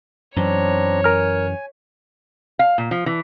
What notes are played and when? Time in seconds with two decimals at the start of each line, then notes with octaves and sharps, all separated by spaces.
0.36 F#2 E3 C4 D4 C#5 A#5
1.04 A#4 G#5 F6
2.59 F5
2.78 A#2
2.91 F3
3.06 E3